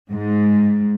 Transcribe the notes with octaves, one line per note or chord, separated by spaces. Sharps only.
G#2